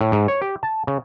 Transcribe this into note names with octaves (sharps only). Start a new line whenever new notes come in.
A2
G#2
C#5
G4
A5
C#3